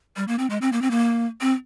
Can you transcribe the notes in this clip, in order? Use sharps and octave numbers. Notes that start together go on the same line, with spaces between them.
G3
A#3
C4
G#3
C4
A#3
C4
A#3
C4